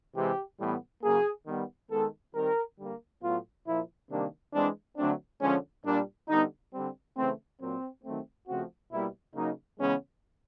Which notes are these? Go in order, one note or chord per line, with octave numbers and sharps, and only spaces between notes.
C3 E3 G#3 C4 G4
A2 E3 G3 B3
C#3 F#3 A#3 G#4
D#3 G3 B3
D#3 G#3 B3 A4
D#3 G3 C4 A#4
D3 G3 A#3
A2 F#3 B3 F4
A#2 F3 A#3 E4
C3 D#3 G3 A#3 D4
E3 G#3 C4 D4
D3 F#3 A3 C4 D4
D3 F3 G#3 C#4
A#2 G3 A#3 D4
D3 G3 B3 D#4
D3 G3 C4
C#3 E3 A3 C4
A#2 F#3 A#3 C4
D#3 F#3 A3 C4
C#3 F3 A3 C4 F#4
B2 G3 A#3 E4
C#3 F#3 A#3 D#4
C#3 E3 G#3 B3 C#4